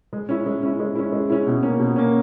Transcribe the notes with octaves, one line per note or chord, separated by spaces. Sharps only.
G#3
C#4 E4
G#3
C#4 E4
G#3
C#4 E4
G#3
C#4 E4
B2
A#3 C#4
B2
A#3 C#4